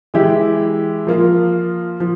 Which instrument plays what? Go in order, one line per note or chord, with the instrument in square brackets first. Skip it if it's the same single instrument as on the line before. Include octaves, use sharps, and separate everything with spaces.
[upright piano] E3 G#3 E4 G4
F3 A#3 F4
F3